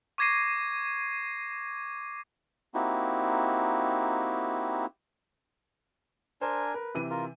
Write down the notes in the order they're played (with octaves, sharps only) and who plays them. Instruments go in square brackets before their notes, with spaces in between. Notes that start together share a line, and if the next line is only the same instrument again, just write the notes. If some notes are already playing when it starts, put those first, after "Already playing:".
[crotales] C#6 D6 G#6 A#6 C7 D#7
[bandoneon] A#3 C4 D#4 E4 F#4 G4
[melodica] D4 A#4 G#5 [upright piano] C5
[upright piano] A#4 [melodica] B4
[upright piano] C3 E3 D#7
[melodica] F4 A#4